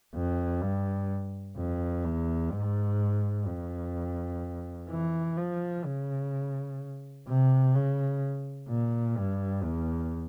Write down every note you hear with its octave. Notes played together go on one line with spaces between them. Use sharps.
F2
G2
F2
E2
G#2
F2
E3
F3
C#3
C3
C#3
A#2
G2
E2